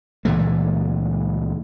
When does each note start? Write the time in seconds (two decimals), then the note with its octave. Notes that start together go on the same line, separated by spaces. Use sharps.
0.25 C#2 A#2 E3 A3